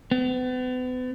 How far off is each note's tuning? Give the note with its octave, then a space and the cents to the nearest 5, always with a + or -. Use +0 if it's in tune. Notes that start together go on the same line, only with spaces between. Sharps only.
B3 +40